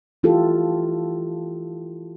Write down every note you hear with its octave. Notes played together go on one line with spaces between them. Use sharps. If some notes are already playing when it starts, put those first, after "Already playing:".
E3 E4 F4 G4 A4